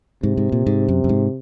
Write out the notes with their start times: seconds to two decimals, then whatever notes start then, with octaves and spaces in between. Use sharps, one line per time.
0.23 G#2 C3
0.37 G#2
0.52 A#2
0.67 G#2
0.89 F#2
1.04 F#2
1.09 G#2